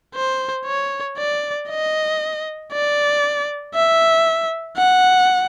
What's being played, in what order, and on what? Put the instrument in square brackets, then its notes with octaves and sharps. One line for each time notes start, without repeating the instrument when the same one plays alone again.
[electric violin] C5
C#5
D5
D#5
D5
E5
F#5